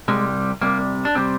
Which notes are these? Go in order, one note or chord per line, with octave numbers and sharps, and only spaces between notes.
C2 C3 G3 G#3
C2 C3 G3 A#3
D4
C3 G3 C4